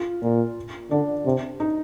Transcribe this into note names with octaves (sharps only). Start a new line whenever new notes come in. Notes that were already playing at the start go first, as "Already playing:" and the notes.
Already playing: F4
A#2
D3 D4
C3
D#4